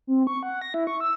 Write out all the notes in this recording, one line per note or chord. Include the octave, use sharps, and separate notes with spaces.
C4
C#6
F#5
A#6
E4
C#6
E6